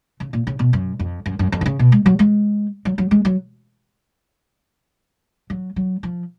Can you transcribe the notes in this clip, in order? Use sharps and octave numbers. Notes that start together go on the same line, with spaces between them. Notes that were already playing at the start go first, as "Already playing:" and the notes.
C#3
A#2
C#3
B2
F#2
F2
F#2
F#2
F2
D#3
C#3
B2
G#3
F#3
G#3
F#3
F#3
G#3
F#3
F#3
F#3
F3